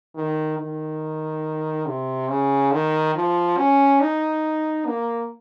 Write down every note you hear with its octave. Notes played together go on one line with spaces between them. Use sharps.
D#3
D#3
C3
C#3
D#3
F3
C#4
D#4
A#3